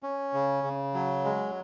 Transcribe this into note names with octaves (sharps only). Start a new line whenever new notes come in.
C#4
C#3
C#3
F#3
G#3